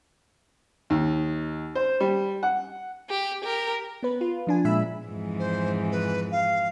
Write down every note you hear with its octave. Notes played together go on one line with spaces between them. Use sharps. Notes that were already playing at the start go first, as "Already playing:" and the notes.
D#2
C5
G3
F#5
G4
G4 A#4
B3 B4
F4
F3 D4 G#5
A#2 G#3 E5 B5 E6
F2 G#2 E3
C5
B4
F5